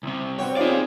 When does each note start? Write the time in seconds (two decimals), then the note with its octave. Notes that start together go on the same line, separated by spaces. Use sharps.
0.03 C2 C3
0.39 G2 C4 F#4 C#5 G5
0.57 D#4 F4 G#4 D5 F5